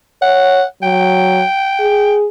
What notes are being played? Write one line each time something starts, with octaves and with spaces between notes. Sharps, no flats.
C#5 F#5
F#3 G5
G#4